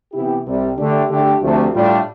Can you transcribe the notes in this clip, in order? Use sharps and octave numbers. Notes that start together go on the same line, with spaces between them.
C3 E3 B3 E4 G4
C2 C3 G3
D3 A3 D4 G4
D3 A3 D4 G4
D2 C3 F3 A3
A2 G3 D4 F4